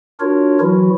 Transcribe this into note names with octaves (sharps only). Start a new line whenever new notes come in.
D4 F4 F#4 A#4 C#5
E3 F#3 E4 F#4